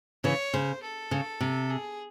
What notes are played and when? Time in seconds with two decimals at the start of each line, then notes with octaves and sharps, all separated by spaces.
0.24 C#3 E3 C#5
0.54 C#3 C5
0.83 A4
1.11 C#3
1.41 C3
1.70 G#4